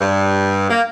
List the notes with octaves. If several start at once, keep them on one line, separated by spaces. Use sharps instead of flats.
G2
A#3